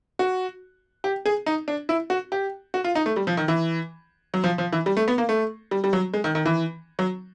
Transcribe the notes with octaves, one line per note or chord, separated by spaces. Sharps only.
F#4
G4
G#4
D#4
D4
E4
F#4
G4
F#4
F4
D#4
A3
G3
F3
D#3
E3
F#3
F3
F3
E3
G3
A3
B3
A#3
A3
G3
G3
F#3
G#3
D#3
D#3
E3
F#3